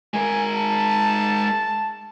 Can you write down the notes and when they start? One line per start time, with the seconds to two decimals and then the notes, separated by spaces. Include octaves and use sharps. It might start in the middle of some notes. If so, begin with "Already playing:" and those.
0.14 G#3 A#4 G#5
0.55 A5